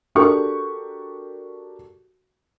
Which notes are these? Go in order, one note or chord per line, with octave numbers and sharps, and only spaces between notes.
D4 F#4 G4 A4 A#4 C#6